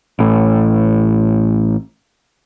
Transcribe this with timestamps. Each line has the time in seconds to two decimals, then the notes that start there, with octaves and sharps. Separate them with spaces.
0.19 A1 A2